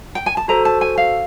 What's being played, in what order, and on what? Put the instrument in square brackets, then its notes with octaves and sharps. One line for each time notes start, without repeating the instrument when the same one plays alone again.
[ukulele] G5
G#5
A5
[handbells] F#4 A4 C5 [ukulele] A#5
[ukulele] A5
G#5
F5